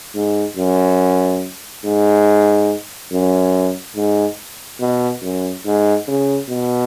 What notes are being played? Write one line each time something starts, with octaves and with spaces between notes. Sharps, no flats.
G#2
F#2
G#2
F#2
G#2
B2
F#2
G#2
C#3
B2